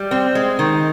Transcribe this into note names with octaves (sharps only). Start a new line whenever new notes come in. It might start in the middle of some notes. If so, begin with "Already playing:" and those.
Already playing: G3
C4
G#3
D#3